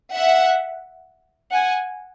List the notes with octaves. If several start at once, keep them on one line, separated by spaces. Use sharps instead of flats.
E5 F#5
F#5 G#5